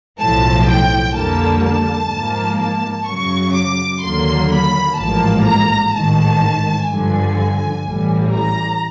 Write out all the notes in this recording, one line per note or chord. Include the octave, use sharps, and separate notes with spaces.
B1 A2 F3 A5
G5
F2 D3 G3 A#3 A5
A5
G#2 F3 A#3
A5
F#2 C#3 F#3 C#6
D6
D#2 D3 F#3 A#3 C6
B5
A1 G#2 F3 A#3 A5
A#5
A1 G#2 D#3 A5
G2 D3 F3 G#5
A1 A2 E3 G3
A#5